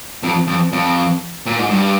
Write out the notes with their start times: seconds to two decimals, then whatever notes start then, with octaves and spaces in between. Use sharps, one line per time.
0.23 F2
0.47 F2
0.72 F2
1.46 A#2
1.59 G#2
1.70 G2